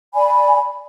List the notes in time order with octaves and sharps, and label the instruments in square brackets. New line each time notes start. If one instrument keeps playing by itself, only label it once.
[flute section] D5 G#5 B5